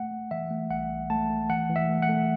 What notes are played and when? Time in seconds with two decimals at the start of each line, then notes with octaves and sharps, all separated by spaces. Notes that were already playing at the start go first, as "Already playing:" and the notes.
Already playing: A3 F#5
0.11 A3
0.31 E3 E5
0.51 A3
0.70 B1 F#5
0.90 B1
1.10 A3 A5
1.29 A3
1.50 E3 F#5
1.69 E3
1.76 E5
1.89 A3
2.02 F#5
2.09 A3